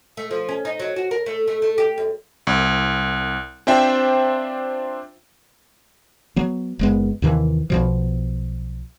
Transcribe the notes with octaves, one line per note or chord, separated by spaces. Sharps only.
A3
F3
C#4
D#4
F#3
F#4
A#4
A3
A3
A3
G4
F#2
C2
C4 D4 F4 C5 E5 G5
F#3 B3
F#1 G#3 B3
D#2 C3 D#3 E3
B1 B2 F3